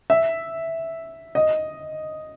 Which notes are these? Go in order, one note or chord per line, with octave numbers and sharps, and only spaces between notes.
E5
D#5